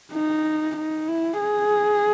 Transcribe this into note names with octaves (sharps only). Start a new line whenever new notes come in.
D#4
D#4
E4
G#4